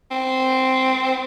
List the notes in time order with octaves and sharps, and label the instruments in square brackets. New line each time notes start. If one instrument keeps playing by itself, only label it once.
[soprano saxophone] C4